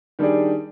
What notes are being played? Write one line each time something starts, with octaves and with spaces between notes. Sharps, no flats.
D#3 G3 D4 G#4 D5